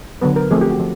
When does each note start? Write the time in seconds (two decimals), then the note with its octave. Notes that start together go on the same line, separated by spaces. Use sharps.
0.21 D3 F#3 B3 B4
0.36 A#4
0.51 F3 A3 C4 G#4
0.61 G4
0.70 F#4
0.80 F3